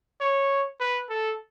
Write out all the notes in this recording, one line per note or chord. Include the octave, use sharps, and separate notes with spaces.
C#5
B4
A4